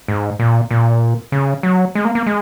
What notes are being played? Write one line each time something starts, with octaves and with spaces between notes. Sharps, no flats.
G#2
A#2
A#2
C#3
F#3
G#3
A#3
A#3
G#3